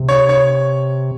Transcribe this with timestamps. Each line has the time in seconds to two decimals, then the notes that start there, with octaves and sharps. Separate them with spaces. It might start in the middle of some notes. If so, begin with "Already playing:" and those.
Already playing: C3
0.09 C#5
0.29 C#5